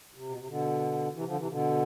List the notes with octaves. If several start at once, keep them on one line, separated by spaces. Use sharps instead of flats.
C3
B2
C3
B2 D3
C3 E3
D3 F3
C3 E3
B2 D3